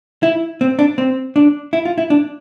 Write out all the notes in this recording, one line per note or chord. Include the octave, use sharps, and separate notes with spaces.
E4
C4
D4
C4
D4
E4
F4
E4
D4